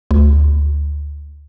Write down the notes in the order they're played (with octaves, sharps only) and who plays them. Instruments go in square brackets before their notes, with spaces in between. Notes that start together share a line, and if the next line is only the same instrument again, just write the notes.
[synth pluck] D2